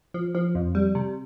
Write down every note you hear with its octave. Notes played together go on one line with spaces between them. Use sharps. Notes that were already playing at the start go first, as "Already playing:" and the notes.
F3
F3
F2
G3
C3